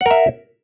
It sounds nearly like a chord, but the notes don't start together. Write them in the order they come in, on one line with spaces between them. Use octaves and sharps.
F#5 A#4 E5